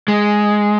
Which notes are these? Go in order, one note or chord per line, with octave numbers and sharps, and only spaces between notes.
G#3